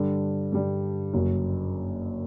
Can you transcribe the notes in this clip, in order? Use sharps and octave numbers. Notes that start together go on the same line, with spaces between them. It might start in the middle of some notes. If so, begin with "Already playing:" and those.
Already playing: G2 D3 G3 D4
G2 D3 G3 D4
F#1 F#2 F#3